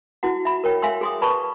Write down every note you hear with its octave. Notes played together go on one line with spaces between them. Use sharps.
E4 F#4 F#5
E5 B5
A#4 C#5 G5
E5 F5 G#5 C6 E6
G#4 C6 D#6
B4 D5 A5 B5 C#6